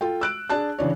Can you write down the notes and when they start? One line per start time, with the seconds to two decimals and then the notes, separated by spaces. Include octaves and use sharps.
0.01 F4 A4 G5
0.21 E6 F#6 D7
0.50 D4 G#4 A5 F#6
0.78 C#3 E3 D4 C#5